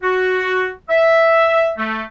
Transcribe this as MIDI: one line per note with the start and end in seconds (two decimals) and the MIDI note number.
0.03 0.71 66
0.89 1.72 76
1.78 2.03 57